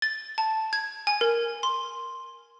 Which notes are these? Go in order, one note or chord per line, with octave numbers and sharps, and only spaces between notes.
A6
A5
G#6
G#5
A#4
C6